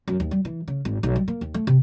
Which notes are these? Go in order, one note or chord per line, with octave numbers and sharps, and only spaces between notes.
F#2
D#2
G3
E3
C#3
G#1
B1
G3
A#3
D#2
A3
C3